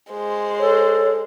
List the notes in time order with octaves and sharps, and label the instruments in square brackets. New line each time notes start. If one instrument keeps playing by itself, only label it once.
[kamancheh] G#3 C5
[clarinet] A4 [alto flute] C#5